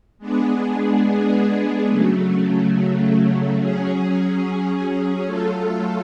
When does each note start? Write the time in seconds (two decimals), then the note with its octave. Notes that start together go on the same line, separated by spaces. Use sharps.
0.18 G#3 B3 D4 G#4
1.87 C#3 F#3 A3
3.56 F#3 C#4 G#4
5.25 F#3 A3 F4 A4